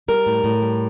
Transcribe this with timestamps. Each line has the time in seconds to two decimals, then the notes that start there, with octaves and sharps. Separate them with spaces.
0.08 G3 A#4
0.26 A2
0.44 A2
0.62 G3